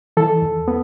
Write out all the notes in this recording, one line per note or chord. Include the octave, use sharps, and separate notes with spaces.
E3 A4
E2
B3